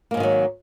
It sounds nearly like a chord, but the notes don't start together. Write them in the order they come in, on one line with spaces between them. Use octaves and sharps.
A#3 G#2 F3 D#3 F#3